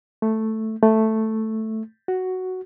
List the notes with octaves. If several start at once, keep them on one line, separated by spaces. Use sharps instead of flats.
A3
A3
F#4